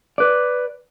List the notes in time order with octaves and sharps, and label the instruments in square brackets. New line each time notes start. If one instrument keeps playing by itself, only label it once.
[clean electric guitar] B4 D5